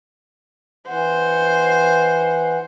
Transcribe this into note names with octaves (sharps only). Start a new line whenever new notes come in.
E3 C5 F#5